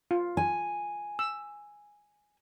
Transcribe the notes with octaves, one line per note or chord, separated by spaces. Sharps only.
F4
G#5
E6